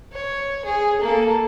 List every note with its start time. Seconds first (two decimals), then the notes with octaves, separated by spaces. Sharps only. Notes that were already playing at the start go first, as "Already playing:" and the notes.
0.13 C#5
0.65 G#4
1.01 A#3 A4